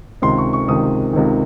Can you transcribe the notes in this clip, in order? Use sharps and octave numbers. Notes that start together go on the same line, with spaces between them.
C#2 C3 D#3 C6
C#6
C#6
C#2 C3 D#3 D#6
C#2 C3 D#3